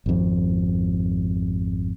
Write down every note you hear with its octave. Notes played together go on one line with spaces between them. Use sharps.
G#1 F2